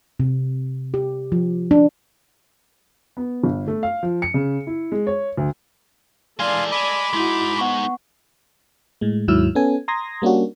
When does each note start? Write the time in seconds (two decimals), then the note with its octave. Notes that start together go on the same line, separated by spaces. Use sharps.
0.20 C3
0.94 G4
1.32 F3
1.71 D4
3.17 B3
3.44 G1
3.67 A3
3.83 F5
4.03 F3
4.22 C#7
4.34 C#3
4.67 E4
4.92 G#3
5.07 C#5
5.37 D2
6.39 E3 G#3 A4 D5 F5 G#5 C6
6.72 D#5 G#5 B5 D6
7.13 G#3 D#4 E4 F#4 C6
7.59 B3 F#5 C#6
9.01 A2 G#3
9.28 D#2 G#2 F#3 E4 E6 F6
9.55 B3 C#4 A4 G#5
9.88 A#5 C6 D#6 G#6 A#6
10.22 G3 A#3 C#4 D4 F#4